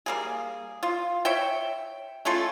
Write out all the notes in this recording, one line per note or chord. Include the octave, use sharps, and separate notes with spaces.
G3 A#3 G#4
F4
C#5 E5 G5
A3 C#4 F4 A4